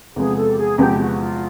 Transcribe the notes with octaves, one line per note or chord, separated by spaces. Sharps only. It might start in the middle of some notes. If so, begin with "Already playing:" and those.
E2 C3 F3 G#3 B3 G#4
A4
G4
G#4
E2 C3 F3 G#3 B3 G4
F#4
F4